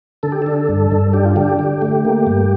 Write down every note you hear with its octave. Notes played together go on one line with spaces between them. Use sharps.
D3 A4
G4
D4 A4
G2
G2
D4 G4
F4
D3 G4
D3
A3
A#3
G2